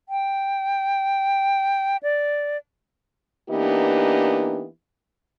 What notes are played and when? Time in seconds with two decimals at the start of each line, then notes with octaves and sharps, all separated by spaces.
0.09 G5
2.03 D5
3.49 E3 A#3 B3 D4 D#4 G4